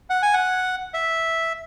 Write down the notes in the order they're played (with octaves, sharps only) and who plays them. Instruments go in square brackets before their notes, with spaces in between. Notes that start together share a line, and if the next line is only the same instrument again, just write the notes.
[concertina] F#5
G#5
F#5
E5